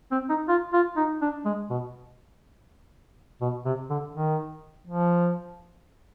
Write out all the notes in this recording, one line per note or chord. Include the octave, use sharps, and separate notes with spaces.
C4
D#4
F4
F4
D#4
D4
G#3
B2
B2
C3
D3
D#3
F3